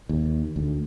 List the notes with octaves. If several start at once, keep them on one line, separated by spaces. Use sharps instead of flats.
D#2
D2